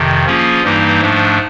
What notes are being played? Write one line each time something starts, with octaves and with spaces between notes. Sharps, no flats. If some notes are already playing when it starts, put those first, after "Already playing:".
Already playing: F2 C3 D#3
F3 A#3 C#4 F4 G#4
G2 E3 G3 A#3 D#4
G#2 F3 A3 D4